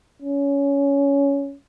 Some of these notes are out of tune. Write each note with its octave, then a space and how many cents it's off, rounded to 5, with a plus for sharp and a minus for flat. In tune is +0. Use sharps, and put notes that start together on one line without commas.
C#4 +15